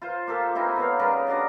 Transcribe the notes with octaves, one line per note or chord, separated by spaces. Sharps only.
F4 C5
A#3 F4 G4 A4
C4 D#4 E4 G4
B3 C#5 F5
C#3 G3 B3 A#4
D4 F#4 D5 D#5